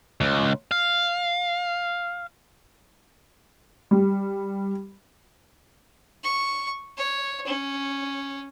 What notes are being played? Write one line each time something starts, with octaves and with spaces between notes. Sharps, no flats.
C#2
F5
G3
C#6
C#5
C#4